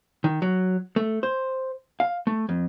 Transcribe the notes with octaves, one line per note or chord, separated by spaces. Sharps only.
D#3
F#3
A3
C5
F5
A3
F2